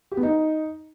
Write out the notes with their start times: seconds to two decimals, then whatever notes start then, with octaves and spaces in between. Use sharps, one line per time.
0.12 G4
0.17 B3
0.23 D#4